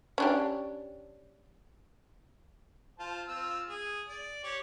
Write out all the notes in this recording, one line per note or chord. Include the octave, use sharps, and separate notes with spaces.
C#4 D4 G4
F4 C5 A5
C4 F4 E6
G#4
D5
G4 C#5 D6